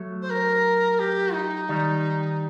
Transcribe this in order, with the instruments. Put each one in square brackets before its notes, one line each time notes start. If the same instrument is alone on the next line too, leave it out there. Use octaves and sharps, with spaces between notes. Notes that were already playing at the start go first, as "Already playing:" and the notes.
Already playing: [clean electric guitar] F#3 A3
[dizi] C5
A#4
G4
D#4
[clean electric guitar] D#3 G3